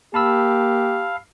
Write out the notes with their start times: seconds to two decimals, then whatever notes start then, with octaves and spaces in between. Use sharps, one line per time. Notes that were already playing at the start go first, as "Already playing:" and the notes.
0.14 A#3 G4 F5 A5 B5 E6